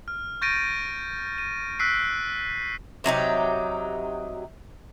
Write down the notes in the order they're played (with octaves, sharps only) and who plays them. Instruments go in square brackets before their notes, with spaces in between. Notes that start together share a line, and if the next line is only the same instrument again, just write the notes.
[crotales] F6
C#6 G6 A6 A#6 D7 D#7
D#7
E6 F#6 B6 C7 D7
[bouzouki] C3 F#3 D#4 G4